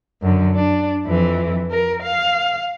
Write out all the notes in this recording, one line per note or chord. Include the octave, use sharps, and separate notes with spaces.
F#2 D3
D4
F2 E3
A#4
F5